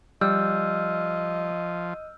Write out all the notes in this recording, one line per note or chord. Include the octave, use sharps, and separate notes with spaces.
F3 G3 D#5 E6 F6 G6